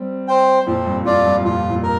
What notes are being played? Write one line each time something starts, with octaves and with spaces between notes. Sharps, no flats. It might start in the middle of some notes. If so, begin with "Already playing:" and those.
Already playing: G3 C4
C5 G5
F2 A#2 C4
G2
F2 F4 D5
G2
G2
F2 A#2 F4
F2 A#2
A#4